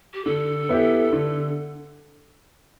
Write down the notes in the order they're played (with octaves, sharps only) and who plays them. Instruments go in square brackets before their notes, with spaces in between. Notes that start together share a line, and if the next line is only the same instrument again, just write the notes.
[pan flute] G4
[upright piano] D3 [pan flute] A4
[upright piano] B3 E4 G4
D3